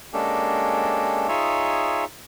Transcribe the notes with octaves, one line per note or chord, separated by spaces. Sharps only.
G#3 A#3 C#4 D4 G4 A4
D#4 F4 G#4 C#5 E5